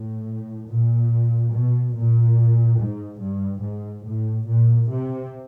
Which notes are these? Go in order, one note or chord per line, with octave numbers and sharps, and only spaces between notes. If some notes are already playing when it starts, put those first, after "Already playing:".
Already playing: A2
A#2
B2
A#2
G#2
G2
G#2
A2
A#2
C3